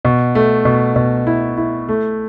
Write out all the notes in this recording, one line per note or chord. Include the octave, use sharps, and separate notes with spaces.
B2
A3
B2
B2
E4
E4
A3